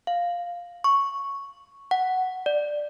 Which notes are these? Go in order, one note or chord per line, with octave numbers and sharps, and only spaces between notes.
F5
C#6
F#5
D5